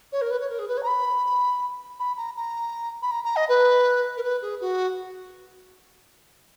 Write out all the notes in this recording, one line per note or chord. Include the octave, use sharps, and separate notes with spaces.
C#5
A#4
B4
C#5
A#4
G#4
B4
C#5
A#5
B5
B5
A#5
A#5
B5
A#5
A#5
D#5
B4
A#4
B4
G#4
F#4